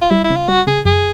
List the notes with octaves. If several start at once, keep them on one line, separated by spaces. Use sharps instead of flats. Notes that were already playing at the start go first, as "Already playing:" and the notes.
F4
G3 E4
E4
C#3
F4
G3 F#4
C#3 G#4
F#2 G#4